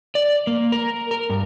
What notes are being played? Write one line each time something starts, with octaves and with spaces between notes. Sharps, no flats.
D5
A#3
A#4
A#4
G2